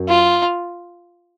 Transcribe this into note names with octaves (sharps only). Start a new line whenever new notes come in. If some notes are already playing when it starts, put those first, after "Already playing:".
Already playing: F#2
F4